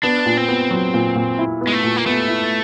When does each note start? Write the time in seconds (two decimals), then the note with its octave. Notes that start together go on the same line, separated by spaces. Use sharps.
0.03 B3 D4
0.26 A#2
0.37 C4
0.48 B3
0.71 F#3
0.94 A#2
1.16 A#2
1.39 E4
1.61 B3
1.67 G#3
1.72 A3
1.84 A#2
1.97 A#3
2.06 A3 B3
2.28 E4